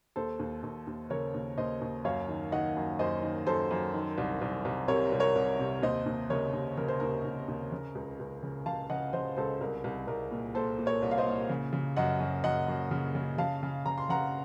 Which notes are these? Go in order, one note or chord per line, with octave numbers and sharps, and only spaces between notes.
D#2 A4 C5
D#2
D#2
D#2
C#3 A#4 C#5
D#2
D#2 C5 D#5
D#2
F#2 C#5 F5
D#3
D#3 D#5 F#5
F#2
F#2 C5 D#5
D#3
F#2 A4 C5
F#2
D#3
C2
C2
C2
C3 A#4 C#5
C2
A#4 C#5
C2
C3
D#2 C5 D#5
D#2
C#3 A#4 C#5
D#2
C#3 A#4
C5
D#2 A#4
D#2
D#2
C#3
C#2
C#2
C#3
C#3 F5 A5
C#3 D#5 F#5
C#3 C5 D#5
C#2 A4 C5
C2 A#4
C2
C2 A#4
A#2
A#2 A4 C5
A#2
A#4 C#5
C2
F5
C5 D#5
A#2
C#3
C#3
F#2 D#5 F#5
F#2
F#2 D#5 F#5
F#2
C#3
C#3
C#3 F5 A5
C#3
C#3 A#5
C6
C#3 F#5 A#5